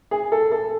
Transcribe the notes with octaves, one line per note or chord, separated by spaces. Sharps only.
G#4
A4
A4